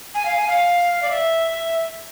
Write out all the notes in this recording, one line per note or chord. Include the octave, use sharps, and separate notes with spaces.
G#5
F5
G#5
F5
D5
E5